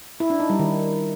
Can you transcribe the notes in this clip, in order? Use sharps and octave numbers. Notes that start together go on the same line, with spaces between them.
E4
D4
D#4
G3
D#3